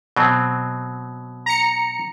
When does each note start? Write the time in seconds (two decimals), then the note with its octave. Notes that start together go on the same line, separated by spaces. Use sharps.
0.17 B2 F#3 C4
1.46 A#5 C#7